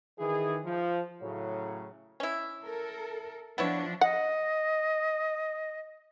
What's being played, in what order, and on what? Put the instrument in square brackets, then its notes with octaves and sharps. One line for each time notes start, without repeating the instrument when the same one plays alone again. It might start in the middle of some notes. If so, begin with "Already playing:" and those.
[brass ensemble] D#3 E3 G#4
F3
A2 C#3 F#3
[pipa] C#4 E4
[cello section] A4 A#4
[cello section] F3 D4 [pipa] B3 E4 C#5
[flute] D#5 [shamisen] F#5